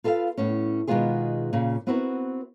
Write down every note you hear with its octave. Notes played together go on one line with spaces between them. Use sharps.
F4 A4 B4 E5 F5
A2 B3 C#4
B2 D#3 G#3 B3 F4 G#4
A#2 C#3
B3 C4 E4 F#4 A#4 B4